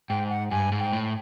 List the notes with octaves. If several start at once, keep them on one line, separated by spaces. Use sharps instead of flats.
G#2 G5
F#5
G2 G#5
G#2
G5
A2